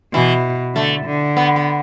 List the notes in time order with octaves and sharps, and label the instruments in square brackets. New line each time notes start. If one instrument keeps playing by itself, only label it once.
[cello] B2 [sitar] E3
[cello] D3 [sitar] A3
[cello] D3
[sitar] B3
B3